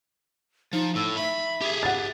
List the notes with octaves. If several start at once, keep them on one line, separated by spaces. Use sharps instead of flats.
F3 D#4
A2 E6
E5 B5
G4 G#4
F#5 A6